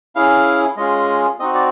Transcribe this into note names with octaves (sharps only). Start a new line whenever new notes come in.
C#4 E4 G#4 F5
G#3 C#4 F4 G#4 D#5
C4 D#4 F#4 D#5
D5